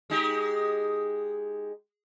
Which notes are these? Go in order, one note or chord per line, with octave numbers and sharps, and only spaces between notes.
G#3 D#4 G4